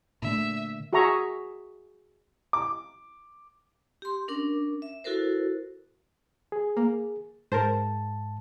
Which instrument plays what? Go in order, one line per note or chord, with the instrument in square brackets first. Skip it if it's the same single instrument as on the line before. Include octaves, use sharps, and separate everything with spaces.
[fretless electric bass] A#2 D3 A3 [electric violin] E5
[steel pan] F#4 G#4 E5 A#5 C#6
[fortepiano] D6
[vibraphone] G4 C6
C#4 D4 A#4 D6
E5
E4 F#4 A4 A#4 C5
[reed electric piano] G#4
[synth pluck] A#3
[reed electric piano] G#2 A5 [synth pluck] A#4 C5